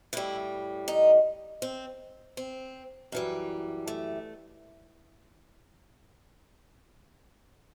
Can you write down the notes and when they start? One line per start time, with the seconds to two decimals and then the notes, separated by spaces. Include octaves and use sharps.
0.13 A2 G3 E4
0.88 D#4
1.62 C4
2.37 C4
3.12 F#2 E3 G3
3.87 A3